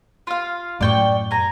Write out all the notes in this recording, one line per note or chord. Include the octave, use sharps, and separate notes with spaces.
F4 F5
F#2 A2 D5 G5 C#6
G#5 A#5